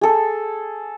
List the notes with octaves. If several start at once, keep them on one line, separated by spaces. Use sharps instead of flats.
G#4 A4